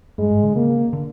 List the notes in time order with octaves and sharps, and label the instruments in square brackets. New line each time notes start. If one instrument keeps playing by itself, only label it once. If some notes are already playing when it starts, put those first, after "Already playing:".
[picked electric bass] G2 [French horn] G#3
[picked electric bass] G#2
D3
[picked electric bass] C#3 [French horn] A#3
[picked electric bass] D3